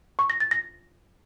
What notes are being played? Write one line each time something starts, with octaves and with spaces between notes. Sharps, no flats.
C#6
A#6
A6
A#6